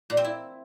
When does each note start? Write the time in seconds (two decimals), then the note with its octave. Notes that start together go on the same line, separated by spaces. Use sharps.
0.10 A#2
0.17 C4
0.24 E4